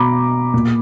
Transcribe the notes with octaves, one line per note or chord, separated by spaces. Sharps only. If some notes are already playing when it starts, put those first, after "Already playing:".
Already playing: B2 A#5 B5 D6
A#2